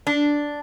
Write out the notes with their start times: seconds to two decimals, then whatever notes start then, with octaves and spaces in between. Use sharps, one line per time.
0.07 D4